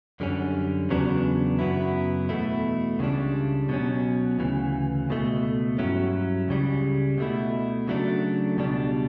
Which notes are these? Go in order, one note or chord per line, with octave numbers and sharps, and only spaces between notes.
F#2 D3 G3 C#4
E2 C#3 F#3 B3 D4
F#2 C#3 F#3 B3 E4
E2 B2 A3 E4
C#2 C#3 G3 D4
B2 F#3 C#4
D2 C#3 E3
C#2 B2 A3
G2 F#3 C#4 E4
C#2 C#3 G3
B2 A3 E4
C#3 F#3 A3 D4
C#2 B2 G3 D4